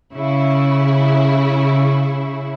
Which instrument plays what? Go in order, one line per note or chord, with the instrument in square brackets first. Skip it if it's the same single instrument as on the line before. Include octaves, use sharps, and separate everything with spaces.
[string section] C#3 E4